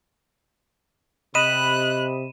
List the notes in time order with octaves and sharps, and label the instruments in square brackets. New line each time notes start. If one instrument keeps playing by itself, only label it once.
[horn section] C3 [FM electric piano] D#5 B5 [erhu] F#6 [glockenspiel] D#7 E7